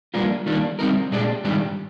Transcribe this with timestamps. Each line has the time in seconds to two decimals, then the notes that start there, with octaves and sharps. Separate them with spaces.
0.14 G3 A#3 D4 F4 A#4
0.46 D#3 G3 A#3 D4
0.79 G3 C4 D#4 A#4
1.12 A#2 G#3 D4 G4 D5
1.44 G#2 D#3 G3 D4 G4